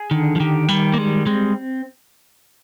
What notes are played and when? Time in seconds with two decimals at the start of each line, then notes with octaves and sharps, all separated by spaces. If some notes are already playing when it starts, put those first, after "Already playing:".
Already playing: G#4
0.11 D3 D#3
0.36 F3
0.40 D#3 G4
0.68 D#3 G3
0.93 A#3
0.98 G3 G#3
1.27 G#3 C4